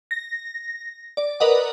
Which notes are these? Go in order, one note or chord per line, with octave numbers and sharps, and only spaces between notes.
A#6
D5
A#4 B4 D5 D#5 F#5